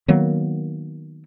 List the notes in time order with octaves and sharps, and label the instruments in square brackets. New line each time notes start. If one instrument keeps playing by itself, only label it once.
[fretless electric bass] D#3 F#3 A#3 B3